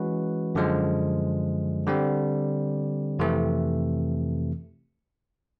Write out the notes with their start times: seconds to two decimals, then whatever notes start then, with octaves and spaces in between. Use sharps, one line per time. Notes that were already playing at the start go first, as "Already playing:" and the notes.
Already playing: E3 G#3 C#4 F#4 B4
0.55 F#2 D3 F3 G#3
1.87 D3 G3 C4
3.19 F2 C3 E3 A3